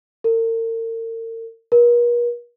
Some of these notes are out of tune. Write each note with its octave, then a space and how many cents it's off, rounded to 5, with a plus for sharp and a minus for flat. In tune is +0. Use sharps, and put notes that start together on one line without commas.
A#4 -40
A#4 +45